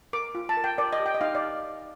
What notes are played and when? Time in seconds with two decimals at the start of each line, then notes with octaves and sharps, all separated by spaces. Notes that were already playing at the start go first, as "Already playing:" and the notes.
0.13 A#4 D6
0.35 F4
0.49 A5
0.57 A#4
0.64 G5
0.78 A#4 D5
0.93 D#5
1.00 G4
1.06 G5
1.14 D#5
1.21 D#4 F5
1.35 D5